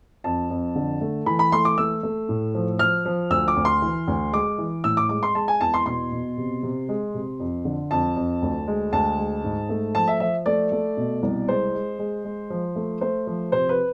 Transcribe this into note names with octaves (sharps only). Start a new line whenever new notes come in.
F2 A5
F2
D3
A3
E3 B5
B5
A3 C6
D6
A3 E6
A3
A2
F3
F3 F6
F3
D2 E6
D6
D2
C6
E3
D2
G#3 D6
E3
A2 E6
D6
G#3 D6
C6
G#3 A5
G#5
E2 A5
C6
B2 C6
B2
C3
C3
G#3
C3
F2
D3
F2 A5
F2
D2
G#3
D2 A5
G#3
G#2
A3
F3 A5
E5
F3 E5
A3 D5
A3
B2
C2
G#3 C5
G#3
G#3
G#3
F3
A3
A3 C5
F3
C3 C5
B4